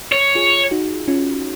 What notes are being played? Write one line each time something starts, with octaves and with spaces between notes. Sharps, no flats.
C#5
F4 G#4
D#4 F#4
C#4 F4